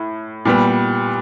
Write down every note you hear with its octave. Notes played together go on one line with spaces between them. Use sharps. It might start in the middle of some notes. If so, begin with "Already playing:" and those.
Already playing: A2
A#2 G3 B3